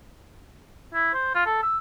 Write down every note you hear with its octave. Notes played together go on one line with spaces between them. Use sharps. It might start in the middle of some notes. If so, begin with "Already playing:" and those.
E4
C5
F4
A4
E6